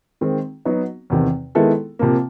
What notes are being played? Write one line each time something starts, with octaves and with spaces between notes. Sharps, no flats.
D#3 G#3 C4
F#3 B3 D#4 F#4
E2 C3 D#3
D#3 G#3 B3 E4 A4
C3 F3 A#3